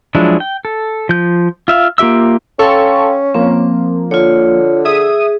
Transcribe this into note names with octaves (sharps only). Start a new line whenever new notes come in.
F3 F#3 G#3 D4 E4
G5
A4
F3 G6
F4 E5 F5
A#3 F4 G4 E5 E6
C#4 A4 F5 G5 C6 C#6 E6
F3 A#3 C4
D3 F4 C#5
G#4 E5 D#6 D#7